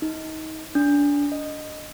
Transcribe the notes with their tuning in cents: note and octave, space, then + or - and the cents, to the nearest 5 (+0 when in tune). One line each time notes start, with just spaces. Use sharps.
D#4 +25
D4 -25
D#5 -15